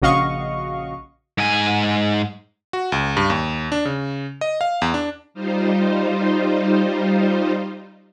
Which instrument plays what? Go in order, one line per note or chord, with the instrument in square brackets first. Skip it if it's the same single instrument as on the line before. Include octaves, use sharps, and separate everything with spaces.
[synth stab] A#1 C#3 F#4 D#5 F5 C#6
[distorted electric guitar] G#2 G#5
[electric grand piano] F#4
C#2
G2
D#2
D4
C#3
D#5
F5
E2
D4
[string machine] G3 D#4 F4 C5